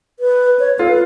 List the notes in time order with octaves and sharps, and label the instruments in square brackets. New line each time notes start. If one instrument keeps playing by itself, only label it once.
[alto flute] B4
C#5
[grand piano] F4 [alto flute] A4
[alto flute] B4